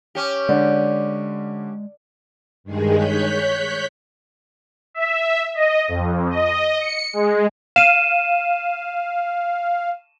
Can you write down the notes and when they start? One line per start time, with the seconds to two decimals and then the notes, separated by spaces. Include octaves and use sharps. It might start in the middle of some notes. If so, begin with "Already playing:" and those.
0.15 C#4 G4
0.49 D3 G#3 D5
2.64 G2 D#3 G#3 G#4
2.95 C#5 F#6 G6 B6
4.94 E5
5.55 D#5
5.88 F2
6.30 D#5
6.80 C#7
7.13 G#3
7.76 F5 D#7 E7